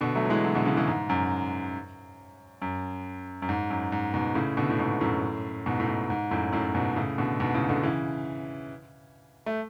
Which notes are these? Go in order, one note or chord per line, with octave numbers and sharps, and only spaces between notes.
B2 D3
F#3 A3
F#3
E3 G#3
D3 F#3
B2 D3
C#3 E3
C#3 E3
G#2
F#2
F#2
F#2
G#2
F#2
G#2
G#2 B2
A2 C#3
B2 D3
A2
G#2 B2
F#2 A2
G#2 B2
A2
G#2
G#2
F#2 A2
F#2 A2
G#2 B2
A2 C#3
B2 D3
G#2 B2
A2 C#3
B2 D3
C#3 E3
A3